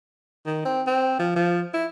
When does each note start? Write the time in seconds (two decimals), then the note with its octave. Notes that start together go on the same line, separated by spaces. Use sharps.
0.46 D#3
0.65 C4
0.87 C4
1.19 F3
1.36 F3
1.74 E4